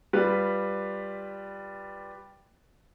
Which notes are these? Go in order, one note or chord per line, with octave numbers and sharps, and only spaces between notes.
G3 F4 B4